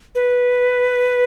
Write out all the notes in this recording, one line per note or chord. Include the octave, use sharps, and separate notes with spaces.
B4